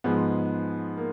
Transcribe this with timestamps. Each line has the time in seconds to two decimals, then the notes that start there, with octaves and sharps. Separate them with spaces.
0.04 G#2 F3 G#3 B3
0.97 A#3